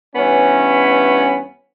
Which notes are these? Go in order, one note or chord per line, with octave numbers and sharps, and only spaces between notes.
G2 E3 B3 C#4